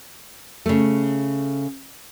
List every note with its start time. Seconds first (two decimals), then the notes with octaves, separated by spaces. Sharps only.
0.66 C#3 A3